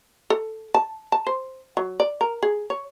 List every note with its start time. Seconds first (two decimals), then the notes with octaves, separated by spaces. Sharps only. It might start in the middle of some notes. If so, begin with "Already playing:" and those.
0.30 A4
0.74 A5
1.12 A5
1.27 C5
1.77 F#3
2.00 D5
2.21 A#4
2.43 G#4
2.70 C#5